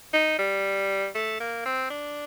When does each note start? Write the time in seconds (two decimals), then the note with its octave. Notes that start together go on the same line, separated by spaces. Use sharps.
0.13 D#4
0.39 G3
1.15 A3
1.40 A#3
1.66 C4
1.90 D4